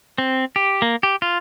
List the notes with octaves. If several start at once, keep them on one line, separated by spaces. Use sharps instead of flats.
C4
G4
A#3
G4
F4